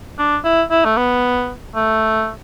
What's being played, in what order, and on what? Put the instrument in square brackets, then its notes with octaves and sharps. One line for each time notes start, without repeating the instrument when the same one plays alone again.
[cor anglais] D4
E4
E4
A3
B3
A3